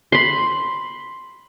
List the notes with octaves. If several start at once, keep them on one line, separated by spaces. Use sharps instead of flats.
B5 C6